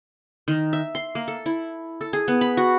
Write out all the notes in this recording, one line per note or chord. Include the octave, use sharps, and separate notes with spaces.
D#3
E5
C6
A#3
A4
E4
A4
G#4
B3
B5
F#4